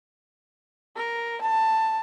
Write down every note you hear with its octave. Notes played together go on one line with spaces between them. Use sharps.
A#4
A5